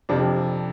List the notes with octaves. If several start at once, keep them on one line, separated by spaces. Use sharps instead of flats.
F2 C3 F3 D4